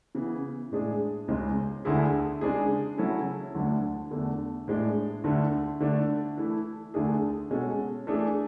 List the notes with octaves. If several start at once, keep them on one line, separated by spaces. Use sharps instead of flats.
C#3 E3 B3
A2 G#3 D4 G#4
C#2 C#3 G#3 C#4
D2 D3 A3 E4 G#4
C#3 G#3 D4 G#4
C#3 F#3 C#4 E4 A4
D2 D3 F#3 A3 D4
E2 D3 A3
A2 G#3 D4
D2 D3 A3
D3 A3 D4
E3 A3 E4
D2 D3 A3 D4 G#4
B2 G#3 C#4 F#4 A4
E3 A3 D4 G#4